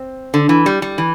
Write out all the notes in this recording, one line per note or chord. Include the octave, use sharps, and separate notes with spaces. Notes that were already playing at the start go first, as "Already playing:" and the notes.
Already playing: C4
D3
E3
G3
G3
E3